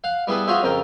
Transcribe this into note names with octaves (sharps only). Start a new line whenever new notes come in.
F5 F#5
G3 B3 E4 G#4 A4 B4
C#4 F4 F#4 G#4 C5 E5
F2 C#3 A#4 G5